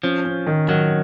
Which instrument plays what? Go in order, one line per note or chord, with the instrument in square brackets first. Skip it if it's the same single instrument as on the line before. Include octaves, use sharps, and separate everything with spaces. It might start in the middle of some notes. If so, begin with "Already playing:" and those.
[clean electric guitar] F3 [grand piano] C#4
[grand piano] C#4
D#3
[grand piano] D#3 [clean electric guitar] F#3